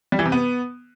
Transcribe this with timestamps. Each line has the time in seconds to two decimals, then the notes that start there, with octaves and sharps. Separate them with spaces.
0.12 G3
0.19 E3
0.25 C3
0.32 B3